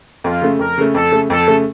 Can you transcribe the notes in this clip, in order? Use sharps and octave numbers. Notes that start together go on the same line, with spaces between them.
F2 F4
C#3 A3
F2 A#4
C#3 A3
F2 A4
C#3 A3
F2 A4
C#3 A3